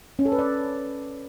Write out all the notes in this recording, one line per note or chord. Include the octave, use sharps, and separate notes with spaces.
C#4
A4
B4
D5